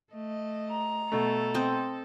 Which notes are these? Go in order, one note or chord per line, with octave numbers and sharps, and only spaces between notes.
A3 D#5
A#5
B2 A3 A4
C4 D#5